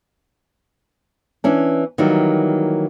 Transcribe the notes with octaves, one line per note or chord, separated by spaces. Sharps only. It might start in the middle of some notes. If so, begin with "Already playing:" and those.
E3 C#4 D4
D#3 E3 F#3 G3 A#3